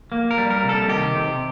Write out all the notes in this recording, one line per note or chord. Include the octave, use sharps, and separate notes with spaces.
A#3
A#4
G3
A#4
C3
A4
D#3 G4
C3